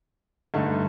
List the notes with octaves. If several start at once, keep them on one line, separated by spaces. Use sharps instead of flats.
G2 D3 A3 D#4